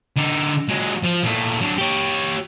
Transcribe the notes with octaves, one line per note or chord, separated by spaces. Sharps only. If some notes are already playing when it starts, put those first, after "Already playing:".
D3 D#4
F#3 G#3
F3
A#2 A3
F#3 D4
G4 C#5